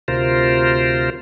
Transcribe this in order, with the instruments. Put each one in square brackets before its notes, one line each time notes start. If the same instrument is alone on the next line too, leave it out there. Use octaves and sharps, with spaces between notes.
[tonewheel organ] D2 C3 F4 A#4 C5